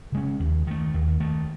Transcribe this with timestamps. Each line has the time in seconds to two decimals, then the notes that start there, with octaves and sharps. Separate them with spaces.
0.12 C#3 G#3 C#4
0.40 D#2
0.67 D#3 A3
0.94 D#2
1.20 D#3 A3